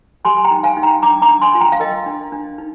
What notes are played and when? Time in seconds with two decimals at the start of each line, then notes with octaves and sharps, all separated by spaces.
0.25 G4 G#5 C6
0.37 G#5
0.44 G5 A#5
0.51 D#4
0.63 F5 G#5
0.77 D#4
0.83 G5 A#5
1.02 D4 A#5 D6
1.22 A#5 D6
1.28 D4
1.42 G#5 C6
1.52 F4 G#5
1.61 G5 A#5
1.72 F5
1.80 A#4 D#5 G5
2.06 D4
2.32 D4
2.58 D#4